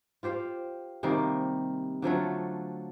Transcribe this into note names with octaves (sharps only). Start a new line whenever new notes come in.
F4 G4 C5 F5
C3 D#3 G3 A#3
D3 F3 F#3 A3